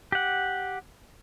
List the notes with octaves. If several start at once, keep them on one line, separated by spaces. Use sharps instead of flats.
G4 F#5